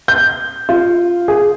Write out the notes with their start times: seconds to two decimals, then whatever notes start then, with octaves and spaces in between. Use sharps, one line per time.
0.08 G6
0.69 F4
1.28 G#4